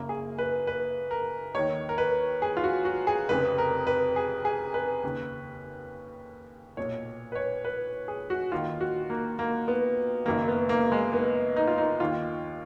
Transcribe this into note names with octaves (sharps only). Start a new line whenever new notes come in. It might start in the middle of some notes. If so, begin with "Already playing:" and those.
Already playing: F#1 F#2 C#3 A#3
G#4
B4
B4
A#4
D#2 D#3 C#5
A#4
B4
G#4
F4
F#4
F#4
G#4
F1 F2 C#3 B4
A#4
B4
G#4
G#4
B4
D#2 C#3
B1 A#2 C#5
B4
C#5
B4
G#4
F#4
D#2 D#3 F4
F#4
A#3
A#3
B3
F#1 F#2 D#3 A#3
B3
A#3
G#3
B3
D#4
F4
D#4
D#2 D#3 F4